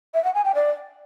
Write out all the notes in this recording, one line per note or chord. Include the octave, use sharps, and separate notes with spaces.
E5
F#5
G#5
G5
D5